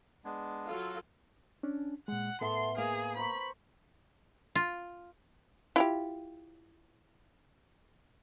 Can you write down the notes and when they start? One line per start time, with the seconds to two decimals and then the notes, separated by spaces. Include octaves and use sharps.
0.24 G#3 B3 D4
0.66 F#3 F4 A4
1.63 C#4 D4
2.08 A#2 G#3 F#5
2.41 A2 B3 A4 E5 C6
2.78 A#3 G#4 F5
3.17 C5 A#5 B5 C#6
4.55 F4
5.76 E4 F4 G4